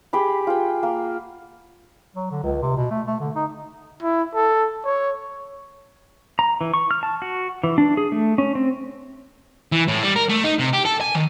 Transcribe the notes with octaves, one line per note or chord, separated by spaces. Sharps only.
G4 G#4 B5
F4 G#4 F#5 G5
A#3
F#3
D3
C#2
C3
B2
A3
A3
D3
D#4
E4
A4
C#5
A#5
E3
C#6
F6
A5
F#4
E3
D4
G#4
A3
C#4
C4
E3
A2
G3
A#4
A3
D#4
C3
G4
A4
G#5
D#3